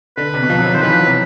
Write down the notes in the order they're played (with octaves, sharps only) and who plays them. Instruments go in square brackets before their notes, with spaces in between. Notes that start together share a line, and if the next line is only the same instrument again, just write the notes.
[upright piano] D3 [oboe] B4
[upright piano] C3
B2
F3
F#3
F3
[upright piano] D#3 [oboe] C5
[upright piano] E3 [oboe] B4
[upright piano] F3
F#3
C3